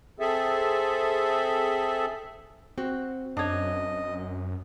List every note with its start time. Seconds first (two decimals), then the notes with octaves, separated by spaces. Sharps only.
0.20 C4 G#4 A4 E5
2.78 C4 F#4
3.37 F#2 D4 C#5 D#5